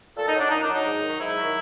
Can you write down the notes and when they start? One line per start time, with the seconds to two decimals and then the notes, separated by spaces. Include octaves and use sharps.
0.17 A#2 A4
0.28 D#4
0.34 F#3
0.40 D4
0.51 A#2 D#4
0.63 D4
0.68 F#3
0.74 D#4
0.85 G#2
1.02 D#3 F#3
1.19 G#2 E4
1.37 D#3 F#3